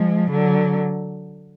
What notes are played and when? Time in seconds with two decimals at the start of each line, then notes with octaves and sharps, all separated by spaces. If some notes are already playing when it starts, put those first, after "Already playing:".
Already playing: F3 G#3
0.31 D3 F#3